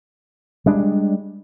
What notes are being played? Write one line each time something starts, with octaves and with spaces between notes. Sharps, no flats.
G3 G#3 D4